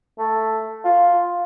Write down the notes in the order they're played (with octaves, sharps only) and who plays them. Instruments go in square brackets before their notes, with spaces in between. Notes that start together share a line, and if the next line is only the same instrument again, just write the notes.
[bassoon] A3
F4